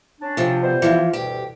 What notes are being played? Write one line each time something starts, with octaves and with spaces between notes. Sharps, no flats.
C#4 D4
C3 F3
B2 G3 C5
E3 F3
D2 G2 B2 G4